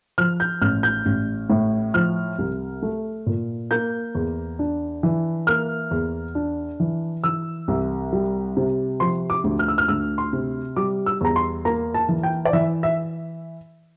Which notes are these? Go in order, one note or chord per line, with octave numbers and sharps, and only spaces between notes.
F3 F6
G6
A1 F6
G6
A1
A2
F3 F6
C2
A3
A#2
A#3 G6
E2
D4
E3
A#3 F6
E2
D4
E3
E3 E6
C2
G3
C3
F3 C6
D6
D2
F6
E6
F6
D2 E6
C6
C3
G3 D6
E6
E2 A#5
C6
A#3 A#5
A5
E3
G5
D5
E3 E5
E5